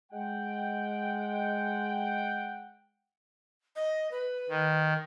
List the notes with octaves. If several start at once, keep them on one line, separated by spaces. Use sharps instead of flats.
G#3 F#5 G5
D#5
B4
D#3